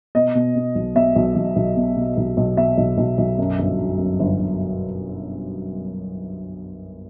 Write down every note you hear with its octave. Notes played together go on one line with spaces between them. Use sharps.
B2 D#5
B2
B2
B1
B2 E5
B1
B1
B1
B2
B2
B1
B1
B2 E5
B1
B1
B1
F#2
G1
G1
F#2
G1
G1